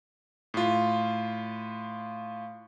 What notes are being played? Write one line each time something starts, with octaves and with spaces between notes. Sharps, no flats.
A2 F4